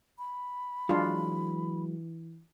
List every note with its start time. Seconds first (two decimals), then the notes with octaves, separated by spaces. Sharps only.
0.19 B5
0.89 E3 F#3 G#3 D4 F4